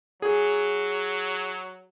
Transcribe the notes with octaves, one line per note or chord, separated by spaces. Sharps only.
F#3 G#4